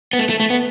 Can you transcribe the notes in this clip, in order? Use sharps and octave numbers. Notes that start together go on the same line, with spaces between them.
B3
A3
A3
A3
B3